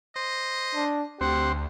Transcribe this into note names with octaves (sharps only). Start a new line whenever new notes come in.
C5 D#5
D4
D2 C4 G4 C5 F#5